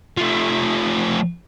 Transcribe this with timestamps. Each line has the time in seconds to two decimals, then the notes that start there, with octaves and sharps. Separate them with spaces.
0.17 F3 A3